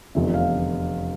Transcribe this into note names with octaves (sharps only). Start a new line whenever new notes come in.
F1 E2 D3 F3 E5
F5